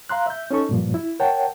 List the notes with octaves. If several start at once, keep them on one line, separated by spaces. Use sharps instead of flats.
F5 A#5 C6 F#6
E5 G6
C#4 D#4 A4 C#6
G2 A#2 F3
E4
A#4 C#5 F#5 G5 A5